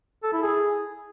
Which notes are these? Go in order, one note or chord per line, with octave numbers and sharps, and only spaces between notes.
A4
E4
G#4